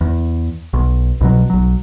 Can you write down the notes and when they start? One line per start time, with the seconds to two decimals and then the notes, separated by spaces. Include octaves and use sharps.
0.01 E2
0.73 B1
1.21 C2 B2 F#3
1.50 B1 F#3